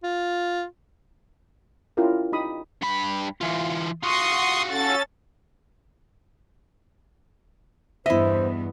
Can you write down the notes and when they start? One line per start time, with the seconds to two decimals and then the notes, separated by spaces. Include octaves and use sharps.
0.03 F4
1.97 C#4 E4 F4 G4 A#4
2.32 D#4 G4 B5 D#6
2.82 G2 B5
3.41 E3 F4
4.03 F4 F#4 C6 C#6 D#6
4.70 C#4 A4 A6
8.06 E2 G2 B3 E4 C5 D#5 E5